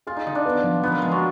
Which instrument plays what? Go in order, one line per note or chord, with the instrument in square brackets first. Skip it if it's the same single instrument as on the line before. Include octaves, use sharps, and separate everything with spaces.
[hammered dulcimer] F4 [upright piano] G#4
[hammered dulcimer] D#4
[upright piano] D#3 [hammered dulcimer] D#4
[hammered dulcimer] D4
[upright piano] B3
F3
[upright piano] F3 [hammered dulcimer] B3
[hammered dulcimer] A#3
[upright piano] F3 [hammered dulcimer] G#3
[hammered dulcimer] F#3